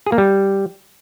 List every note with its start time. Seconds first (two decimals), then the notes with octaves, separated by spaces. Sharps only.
0.06 G#4
0.12 A#3
0.18 G3